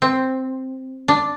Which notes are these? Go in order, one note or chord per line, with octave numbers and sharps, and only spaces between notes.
C4
D4